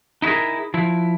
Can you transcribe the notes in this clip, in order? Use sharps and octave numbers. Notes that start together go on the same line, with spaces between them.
D#4 E4 F#4 G#4 A#4
F3 E4